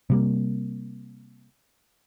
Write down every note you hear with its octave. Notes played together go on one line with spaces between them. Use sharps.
C3 G3 A#3